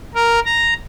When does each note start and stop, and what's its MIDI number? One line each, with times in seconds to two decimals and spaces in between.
0.15 0.39 70
0.45 0.74 82